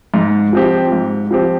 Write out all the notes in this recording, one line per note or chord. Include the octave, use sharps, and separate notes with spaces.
G#2
F3 C4 G4
G#2
F3 C4 G4